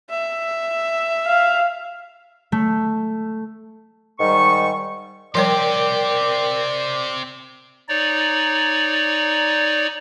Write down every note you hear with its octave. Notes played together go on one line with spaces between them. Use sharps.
E5
F5
A3
G#2 D#3 G3 C#6
F3 G3 C4 G4 A#4 C#5 D5 G5
D#4 C#5 D5